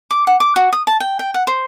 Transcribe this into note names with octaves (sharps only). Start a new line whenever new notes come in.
D6
F#5
D6
F#4
D#6
A5
G5
G5
F#5
C5